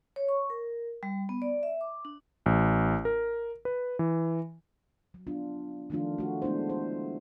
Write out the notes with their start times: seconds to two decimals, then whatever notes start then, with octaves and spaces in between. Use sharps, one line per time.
0.16 C#5
0.28 C#6
0.50 A#4
1.03 G3
1.29 B3
1.42 D5
1.63 E5
1.81 D6
2.05 D4
2.46 A1
3.05 A#4
3.65 B4
3.99 E3
5.14 F#3
5.27 B3 D4 F4
5.90 D#3 F3 A3 D4 F4
6.18 A3 F#4
6.42 G#3 A3 B3 D4 E4 C5
6.70 C5